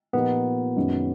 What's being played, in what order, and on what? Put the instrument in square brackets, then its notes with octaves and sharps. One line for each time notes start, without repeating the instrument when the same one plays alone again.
[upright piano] A#2 F3 A#3 D#4 G4 [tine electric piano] B3
[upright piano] F#2 D#3 G#3 C#4